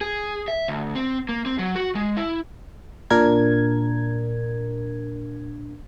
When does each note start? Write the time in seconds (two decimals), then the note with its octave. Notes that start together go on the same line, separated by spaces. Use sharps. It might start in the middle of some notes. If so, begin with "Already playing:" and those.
0.01 G#4
0.48 E5
0.68 D2
0.95 C4
1.29 A#3
1.46 C4
1.59 F#3
1.76 F#4
1.95 G#3
2.17 E4
3.10 A#2 D4 A#4 G#6